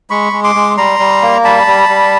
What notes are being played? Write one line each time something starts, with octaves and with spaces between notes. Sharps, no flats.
G#3 B5 C#6
G#3
C6 D6
G#3
G3 A#5 C6
G3
A#3
G3 A5 B5
G3
G3